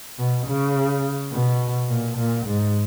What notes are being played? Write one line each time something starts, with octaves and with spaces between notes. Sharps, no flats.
B2
C#3
B2
A#2
A#2
G#2